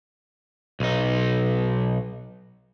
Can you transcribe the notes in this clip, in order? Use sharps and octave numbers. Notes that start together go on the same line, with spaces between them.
B1 D#4